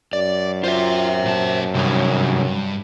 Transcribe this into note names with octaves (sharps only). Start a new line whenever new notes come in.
F#2 D5
F4 C5 E5
A#2 A5
G2 C3 D#3 C#5